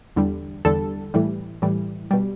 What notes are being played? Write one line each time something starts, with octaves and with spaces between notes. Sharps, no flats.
E2 D3 G3
E2 D3 G3 A4
A2 E3 G3
A2 E3 G3
B2 G3